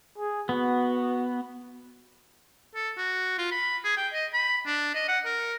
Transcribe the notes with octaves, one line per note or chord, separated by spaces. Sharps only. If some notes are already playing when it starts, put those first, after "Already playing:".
G#4
B3 F#4
A4
F#4
F4
B5
G#4
G5
D#5
B5
D4
D#5
F#5
A#4